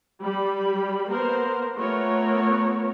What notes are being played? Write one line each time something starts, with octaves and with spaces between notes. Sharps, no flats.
G3 B5
A#3 B3 A#4 C5
A3 B3 F4 A#4 C#5